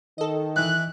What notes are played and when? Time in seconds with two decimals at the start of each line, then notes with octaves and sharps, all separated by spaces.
0.18 D#3 A4 D#5
0.56 E3 F#6